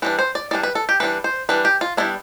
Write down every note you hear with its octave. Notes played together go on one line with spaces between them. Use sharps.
E3 G3 D4 B4
C5
D5
E3 G3 D4 D5
B4
A4
G4
E3 G3 D4 B4
C5
E3 G3 D4 B4
G4
F4
G3 B3 D4 E4